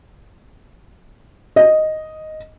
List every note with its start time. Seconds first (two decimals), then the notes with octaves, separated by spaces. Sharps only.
1.56 D#5